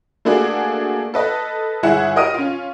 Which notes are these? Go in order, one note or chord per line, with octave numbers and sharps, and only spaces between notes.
A3 A#3 D4 F#4 G#4
A4 B4 D#5
G1 E4 G#4 E5 F#5 E7
G4 A#4 D#5 D#6 F6 D#7
C#4 F4